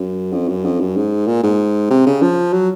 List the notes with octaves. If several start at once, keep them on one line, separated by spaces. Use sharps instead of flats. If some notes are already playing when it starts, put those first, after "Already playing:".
Already playing: F#2
F2
F#2
F2
F#2
G#2
A#2
G#2
C3
C#3
F3
F#3